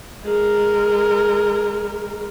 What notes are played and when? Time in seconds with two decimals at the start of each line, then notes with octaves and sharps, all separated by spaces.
0.24 G#3 A#4